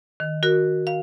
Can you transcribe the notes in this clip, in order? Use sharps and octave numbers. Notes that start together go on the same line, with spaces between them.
D#3
F#4 A#4 F#6
F5